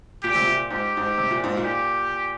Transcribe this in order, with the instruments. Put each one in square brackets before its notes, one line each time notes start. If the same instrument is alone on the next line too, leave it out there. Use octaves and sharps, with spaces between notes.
[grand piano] A#2 [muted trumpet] G4
[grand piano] C3
A#2
[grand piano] G#2 [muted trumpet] G4
[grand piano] G#2
C3
A#2
G#2
A#2
[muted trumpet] G4